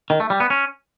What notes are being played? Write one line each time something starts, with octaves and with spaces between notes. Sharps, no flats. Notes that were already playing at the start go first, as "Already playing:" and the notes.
D#3
A3
G3
B3
C#4